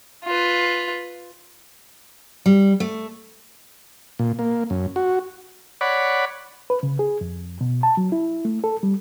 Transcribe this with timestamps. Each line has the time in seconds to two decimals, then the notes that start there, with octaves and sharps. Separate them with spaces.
0.25 F4 B4
2.46 G3
2.80 A3
4.19 A#2
4.39 A#3
4.70 F#2
4.96 F#4
5.81 C#5 D5 F#5 B5
6.70 B4
6.83 C#3
6.99 G#4
7.21 F2
7.61 B2
7.83 A5
7.97 F#3
8.12 E4
8.45 A3
8.64 A4
8.83 G3